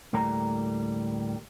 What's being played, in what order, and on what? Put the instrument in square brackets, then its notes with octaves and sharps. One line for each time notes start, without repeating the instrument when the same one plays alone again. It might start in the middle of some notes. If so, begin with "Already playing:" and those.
[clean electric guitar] D2 A2 G3 A#3 A#5